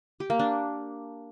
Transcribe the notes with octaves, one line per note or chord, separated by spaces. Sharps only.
G4
A#3
D4